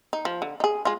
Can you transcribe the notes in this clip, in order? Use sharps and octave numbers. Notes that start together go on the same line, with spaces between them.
D#4
F3
D3
D#4 G#4
G#3 F4